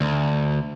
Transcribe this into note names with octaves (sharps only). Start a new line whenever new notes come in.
D2